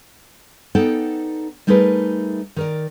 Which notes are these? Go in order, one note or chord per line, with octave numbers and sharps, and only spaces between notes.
B3 D#4 A4 D5 F#5 G5
G3 A3 D#4 G#4 A#4 B4
D#3 A#4 D5